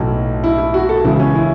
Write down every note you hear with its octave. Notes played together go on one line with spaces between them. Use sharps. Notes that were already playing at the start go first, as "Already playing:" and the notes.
Already playing: B1 A2 F#3
E4
E4
F#4
A4
C#2 C#3 E3 E4
C#4
E4